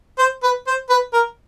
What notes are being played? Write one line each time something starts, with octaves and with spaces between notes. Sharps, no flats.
C5
B4
C5
B4
A#4